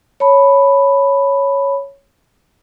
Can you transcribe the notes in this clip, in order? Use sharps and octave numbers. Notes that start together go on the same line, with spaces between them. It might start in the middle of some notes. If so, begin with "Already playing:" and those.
C#5 A5 B5